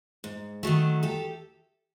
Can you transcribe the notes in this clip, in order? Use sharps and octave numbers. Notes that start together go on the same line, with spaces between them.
G#2
D#3 F#3 A3
G4 A4